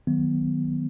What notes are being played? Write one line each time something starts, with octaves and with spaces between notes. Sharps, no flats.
D#3 F#3 B3